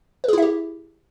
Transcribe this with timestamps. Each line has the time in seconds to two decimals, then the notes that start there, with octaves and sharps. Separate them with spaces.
0.24 B4
0.28 G#4
0.33 E4
0.38 E5
0.42 G4